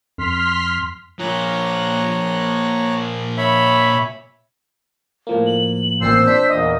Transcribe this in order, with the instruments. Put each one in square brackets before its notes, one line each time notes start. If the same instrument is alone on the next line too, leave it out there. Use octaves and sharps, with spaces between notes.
[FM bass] F2 [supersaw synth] C6 F6 B6
[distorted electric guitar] A#2 F3 [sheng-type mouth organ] C#5 A#5 F#6
[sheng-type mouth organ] C#5 E5 B5
[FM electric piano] A2 F3 A#3
[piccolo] F#7
[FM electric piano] A1 A#2 C4 [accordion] C5 E6 [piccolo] C7
[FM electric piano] D4 [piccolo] B6
[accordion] E2 A#2 [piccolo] D#5